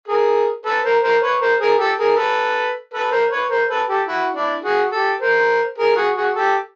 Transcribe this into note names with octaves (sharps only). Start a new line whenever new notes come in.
G#4 A#4
A4 B4
A#4 C5
A#4 C5
B4 C#5
A#4 C5
G#4 A#4
G4 A4
G#4 A#4
A4 B4
A4 B4
A#4 C5
B4 C#5
A#4 C5
A4 B4
G4 A4
E4 F#4
D4 E4
F#4 G#4
G4 A4
A#4 C5
G#4 A#4
F#4 G#4
F#4 G#4
G4 A4